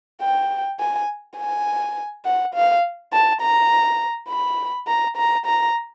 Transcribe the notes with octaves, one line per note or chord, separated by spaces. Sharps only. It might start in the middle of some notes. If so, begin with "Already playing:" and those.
G5
G#5
G#5
F#5
F5
A5
A#5
B5
A#5
A#5
A#5